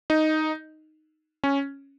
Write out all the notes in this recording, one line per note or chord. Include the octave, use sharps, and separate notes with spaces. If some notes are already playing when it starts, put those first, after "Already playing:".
D#4
C#4